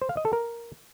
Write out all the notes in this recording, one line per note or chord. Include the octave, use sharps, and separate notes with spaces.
C5
F5
D#5
A4
A#4